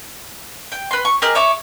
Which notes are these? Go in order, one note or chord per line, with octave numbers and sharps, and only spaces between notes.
G5
B4 C6
C#6
G4 G#4 A#4 D#5
C#5 E5 C#6 D6